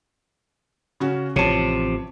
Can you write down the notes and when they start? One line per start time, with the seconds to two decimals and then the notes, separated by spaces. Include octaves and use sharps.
1.00 C#3 C#4 F#4
1.36 A1 C3 F3 C#5 A5